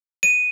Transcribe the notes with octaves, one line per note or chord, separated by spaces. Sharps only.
D#7